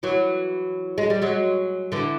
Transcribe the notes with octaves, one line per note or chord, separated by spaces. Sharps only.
E3 F#3
G#3
G3
F#3 G#3
D3 E3